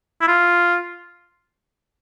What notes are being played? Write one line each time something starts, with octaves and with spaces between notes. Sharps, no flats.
E4
F4